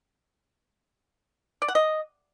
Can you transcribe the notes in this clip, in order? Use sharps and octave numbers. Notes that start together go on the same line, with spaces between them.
D5
F#5
D#5